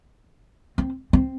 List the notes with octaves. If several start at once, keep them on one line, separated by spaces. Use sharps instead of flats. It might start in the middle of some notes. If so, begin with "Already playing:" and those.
C4
C4